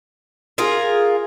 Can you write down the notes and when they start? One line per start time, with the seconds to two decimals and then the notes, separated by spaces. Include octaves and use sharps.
0.58 F4 G#4 A#4